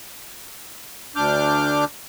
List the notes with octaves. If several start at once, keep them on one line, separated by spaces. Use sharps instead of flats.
D2 D4 D6 F6 G6